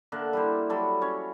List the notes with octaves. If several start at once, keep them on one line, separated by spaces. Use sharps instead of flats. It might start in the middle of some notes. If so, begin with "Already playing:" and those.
D3 A#3 E5 F#5
G3 E4 C5
F#3 G3 A4 B5
C#4 C#5